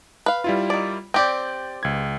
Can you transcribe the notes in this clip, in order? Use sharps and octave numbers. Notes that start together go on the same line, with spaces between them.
B4 F5
G3 E4 F4
D#3 D5
C4 G4 D5 G5
C#2 G#6